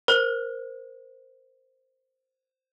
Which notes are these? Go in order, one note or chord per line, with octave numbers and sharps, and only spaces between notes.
A#4 C5